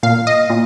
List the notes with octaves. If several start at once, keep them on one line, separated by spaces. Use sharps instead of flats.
A#2 F5
D#5
A#2